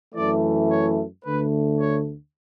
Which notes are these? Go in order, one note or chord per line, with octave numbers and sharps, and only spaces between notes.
F#2 E3 A3 D5
C#5
D2 D3 A3 B4
C#5